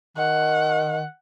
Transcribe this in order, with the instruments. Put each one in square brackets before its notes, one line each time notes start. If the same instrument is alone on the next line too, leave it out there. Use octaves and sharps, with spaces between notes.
[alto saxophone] D#3 [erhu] F#5